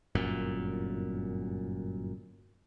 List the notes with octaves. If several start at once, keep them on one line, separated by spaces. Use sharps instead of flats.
G1 F#2 A#2